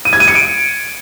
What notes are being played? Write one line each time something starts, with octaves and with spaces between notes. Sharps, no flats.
D#7
G#6
D#7
C#7
D7